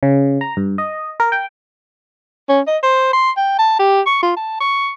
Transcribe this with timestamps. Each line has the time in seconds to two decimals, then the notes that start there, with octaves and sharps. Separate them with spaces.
0.03 C#3
0.41 A#5
0.57 G2
0.78 D#5
1.20 A#4
1.32 G5
2.49 C#4
2.67 D#5
2.83 C5
3.13 C6
3.37 G5
3.59 A5
3.79 G4
4.06 C#6
4.23 F4
4.37 A5
4.61 C#6